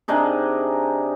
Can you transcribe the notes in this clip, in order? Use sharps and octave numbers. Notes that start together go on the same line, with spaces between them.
C3 D4 D#4 G#4